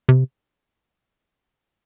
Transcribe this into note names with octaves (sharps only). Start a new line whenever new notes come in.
C3